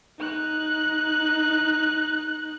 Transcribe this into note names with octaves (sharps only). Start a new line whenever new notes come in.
D#4 F#6